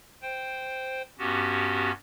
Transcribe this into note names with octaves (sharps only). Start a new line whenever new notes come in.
C5 G5
G2 B3 C#4 F#4 G4